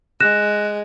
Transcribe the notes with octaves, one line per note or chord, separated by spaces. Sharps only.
G#3 F#6 A#6 E7